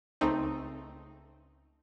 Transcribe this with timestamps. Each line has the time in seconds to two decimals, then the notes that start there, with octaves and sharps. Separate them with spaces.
0.21 C#2 A3 C4 D#4